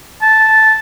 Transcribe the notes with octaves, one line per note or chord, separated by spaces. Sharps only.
A5